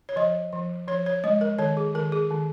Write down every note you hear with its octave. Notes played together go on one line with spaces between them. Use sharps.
C#5
F3 D#5
F3
F3 C#5
C#5
G#3 D#5
A#4
D#3 C#5
G#4
D#3 A#4
G#4
D#3